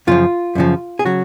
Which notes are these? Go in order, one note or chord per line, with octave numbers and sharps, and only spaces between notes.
F#2 C#3 F3 F4
F#2 C#3 F3
G#4
C#3 F#3 F#4